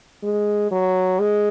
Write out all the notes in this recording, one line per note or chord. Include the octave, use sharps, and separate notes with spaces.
G#3
F#3
G#3